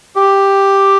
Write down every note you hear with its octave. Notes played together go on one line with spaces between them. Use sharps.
G4